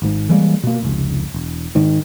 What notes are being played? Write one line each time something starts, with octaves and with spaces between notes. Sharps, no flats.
G#1 G#2
E3 G3 G#3 A#3
B2 A#3
F1 C#2
E1
G#2 D#3